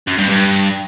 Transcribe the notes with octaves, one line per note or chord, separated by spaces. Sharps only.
F#2
G2
G2